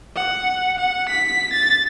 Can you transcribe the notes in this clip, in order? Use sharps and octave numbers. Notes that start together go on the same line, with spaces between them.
F#5
F#5
B6
A6